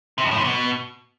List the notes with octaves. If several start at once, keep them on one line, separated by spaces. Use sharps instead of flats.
C3
F2
A2
C3
B2